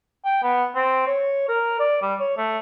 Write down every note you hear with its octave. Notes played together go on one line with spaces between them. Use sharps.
G5
B3
C4
C#5
A#4
D5
G3
C#5
A3